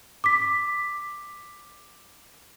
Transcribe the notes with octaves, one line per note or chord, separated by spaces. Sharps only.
D6 B6